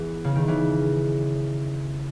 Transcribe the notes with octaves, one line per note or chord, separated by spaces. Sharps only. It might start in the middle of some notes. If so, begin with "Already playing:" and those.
Already playing: E3 B3 G#4
C#3
D#3
C#3 E3